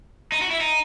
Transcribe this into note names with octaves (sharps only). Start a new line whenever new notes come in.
D#4
F#4
E4
D#4